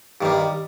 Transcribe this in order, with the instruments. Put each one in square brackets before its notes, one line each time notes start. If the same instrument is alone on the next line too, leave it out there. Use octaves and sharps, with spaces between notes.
[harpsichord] G2 D#3 G3